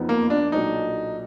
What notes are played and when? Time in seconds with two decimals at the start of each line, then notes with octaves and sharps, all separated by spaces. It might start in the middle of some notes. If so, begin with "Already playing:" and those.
Already playing: F#1 F2 F3 B3 D#4
0.09 A#3
0.30 D4
0.52 B1 A#2 F#3 D4 D#4